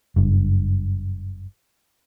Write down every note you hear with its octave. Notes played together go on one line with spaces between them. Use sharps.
F#1 G2